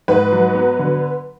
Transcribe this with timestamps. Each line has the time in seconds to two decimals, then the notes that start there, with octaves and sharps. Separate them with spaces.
0.08 G#2 B4
0.32 F#3
0.55 B3
0.79 D3